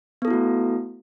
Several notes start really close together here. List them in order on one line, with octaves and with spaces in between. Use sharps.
B3 A4 E4 F#4 A3